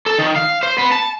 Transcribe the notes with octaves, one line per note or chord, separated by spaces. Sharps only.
A4
D#3
F5
C5
B3
A5